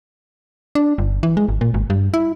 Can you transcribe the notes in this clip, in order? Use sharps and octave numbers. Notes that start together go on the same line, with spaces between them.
D4
G1
E3
G#3
G#1
A#2
G#1
G2
E4